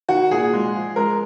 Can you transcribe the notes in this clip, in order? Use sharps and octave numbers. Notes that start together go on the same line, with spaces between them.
D#3 F#4
A#2 G#4
G#3
F3
G#3 A#4